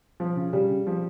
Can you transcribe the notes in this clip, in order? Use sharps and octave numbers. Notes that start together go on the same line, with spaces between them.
F3
C#3
C#3 G3
C#3
F3